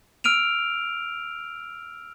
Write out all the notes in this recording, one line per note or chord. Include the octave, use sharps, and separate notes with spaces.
E6 F6 D7 D#7 F7